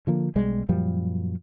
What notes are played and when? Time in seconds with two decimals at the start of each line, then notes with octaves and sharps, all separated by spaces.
0.07 D3 F3 A#3
0.35 B1 B2 G3 G#3
0.69 F#2 A#2 F3 G3